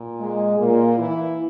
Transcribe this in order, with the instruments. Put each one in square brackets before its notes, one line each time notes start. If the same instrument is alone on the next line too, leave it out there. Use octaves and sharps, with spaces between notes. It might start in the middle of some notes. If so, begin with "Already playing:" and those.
Already playing: [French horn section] A#2
G#3
A#2 A#3
E3 E4